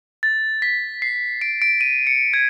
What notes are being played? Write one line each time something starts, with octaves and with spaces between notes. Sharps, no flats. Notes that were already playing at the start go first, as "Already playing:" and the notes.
A6
B6
C7
D7
D7
D#7
C#7
G#6